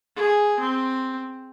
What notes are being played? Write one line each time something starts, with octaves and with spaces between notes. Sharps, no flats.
G#4
C4